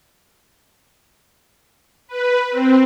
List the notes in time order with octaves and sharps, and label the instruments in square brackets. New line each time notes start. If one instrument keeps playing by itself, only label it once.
[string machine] B4
C4